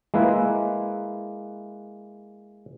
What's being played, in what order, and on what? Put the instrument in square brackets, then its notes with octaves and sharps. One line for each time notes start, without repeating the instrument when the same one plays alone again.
[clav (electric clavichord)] G#3 A#3 E4 B4